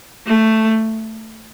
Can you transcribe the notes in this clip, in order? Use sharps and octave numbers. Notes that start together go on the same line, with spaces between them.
A3